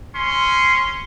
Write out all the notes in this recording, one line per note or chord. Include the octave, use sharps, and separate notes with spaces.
C#4 C6